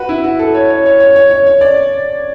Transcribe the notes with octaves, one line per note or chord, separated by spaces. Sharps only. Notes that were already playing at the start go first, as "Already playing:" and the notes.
Already playing: F#4 B4
E4
F#4
A4
C#5
C#5
C#5
C#5
C#5
C#5
C#5
D5